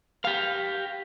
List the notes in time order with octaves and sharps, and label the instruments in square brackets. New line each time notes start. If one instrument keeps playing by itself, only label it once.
[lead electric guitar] G4 F5